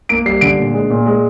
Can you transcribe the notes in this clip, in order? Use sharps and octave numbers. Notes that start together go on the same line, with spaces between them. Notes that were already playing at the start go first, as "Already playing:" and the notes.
A#3 D7
G3 C7
D3 D7
A#2
G#3
A#2
G#3